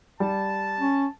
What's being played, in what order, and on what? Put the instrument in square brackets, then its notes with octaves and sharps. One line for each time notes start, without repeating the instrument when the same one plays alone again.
[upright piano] G3 [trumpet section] A5
[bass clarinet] C#4